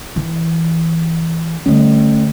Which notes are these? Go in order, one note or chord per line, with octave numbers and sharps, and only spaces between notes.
E3
D3 G3 A3 C#4